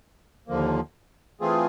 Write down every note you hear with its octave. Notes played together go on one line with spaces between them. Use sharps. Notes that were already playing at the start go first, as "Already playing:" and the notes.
D#2 D3 F3 A#3
E3 A3 C4 F4 G#4